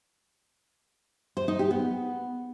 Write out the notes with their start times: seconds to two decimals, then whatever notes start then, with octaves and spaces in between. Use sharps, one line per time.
1.37 C5
1.48 D#4
1.59 G4
1.71 B3